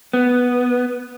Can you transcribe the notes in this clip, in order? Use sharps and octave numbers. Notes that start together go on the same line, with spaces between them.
B3